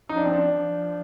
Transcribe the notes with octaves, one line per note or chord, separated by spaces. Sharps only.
F3 D#4
D4
C4
D4
F3